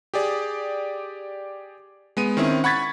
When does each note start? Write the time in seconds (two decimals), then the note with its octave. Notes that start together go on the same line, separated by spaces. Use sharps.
0.14 G4 G#4 D5
2.17 G#3 B3 D#7
2.37 D#3 C4 C#4 E4
2.64 F#5 B5 C#6 G#6 A6 B6